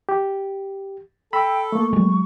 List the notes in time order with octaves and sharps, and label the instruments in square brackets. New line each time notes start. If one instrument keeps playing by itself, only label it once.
[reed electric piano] G4
[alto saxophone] A4 [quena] G5 [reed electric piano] B5 E6
[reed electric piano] A3 A#3 [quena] C#6
[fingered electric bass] F#3 G#3